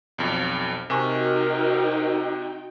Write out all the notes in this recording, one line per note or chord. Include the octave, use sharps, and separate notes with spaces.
B1 F2
C3 D#4 F#4 G4 A#4 G5 G#5 C#6